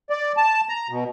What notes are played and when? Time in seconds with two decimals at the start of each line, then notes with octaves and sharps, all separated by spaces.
0.10 D5
0.37 A5
0.69 A#5
0.89 B2